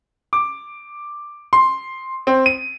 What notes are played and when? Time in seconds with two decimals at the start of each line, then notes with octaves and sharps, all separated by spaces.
0.33 D6
1.53 C6
2.27 C4
2.46 D#7